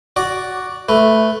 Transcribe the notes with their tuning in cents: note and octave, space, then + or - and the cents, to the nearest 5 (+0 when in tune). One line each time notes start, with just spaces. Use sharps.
F#4 +5 D5 +0
A3 +0 B4 +5